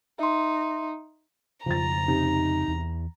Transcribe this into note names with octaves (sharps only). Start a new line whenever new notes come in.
D#4 E5 C6
F2 C#3 F3 A#5 A6
C3 D#4
E2